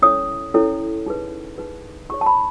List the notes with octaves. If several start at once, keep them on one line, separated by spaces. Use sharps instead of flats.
C#4 E4 A4 C#5 D#6
C#4 E4 A4 C#5
D#4 G#4 B4
D#4 G#4 B4
D#4 G#4 C#5 C#6
A5
B5